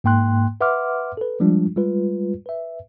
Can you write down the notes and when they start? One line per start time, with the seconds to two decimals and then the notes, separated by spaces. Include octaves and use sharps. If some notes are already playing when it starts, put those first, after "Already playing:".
0.04 G#2 A#3 G5 C6 F#6
0.61 B4 E5 F#5 C6 D6 F6
1.17 A4 B4
1.40 F3 G3 G#3 D4 F4
1.76 G3 G#3 F4 B4
2.46 B4 E5